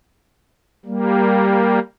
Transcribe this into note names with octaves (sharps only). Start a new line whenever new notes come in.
G3 A#3